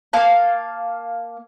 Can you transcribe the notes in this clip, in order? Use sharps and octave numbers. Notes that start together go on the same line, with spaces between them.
A#3 F5 A5